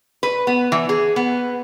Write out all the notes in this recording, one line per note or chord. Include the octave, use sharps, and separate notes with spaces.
B4
B3
E3
G#4
B3